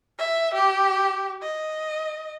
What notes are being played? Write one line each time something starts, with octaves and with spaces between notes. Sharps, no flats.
E5
G4
D#5